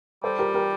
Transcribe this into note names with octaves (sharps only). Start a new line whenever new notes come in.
G3 A4 C5
G4 A#4
G4 A#4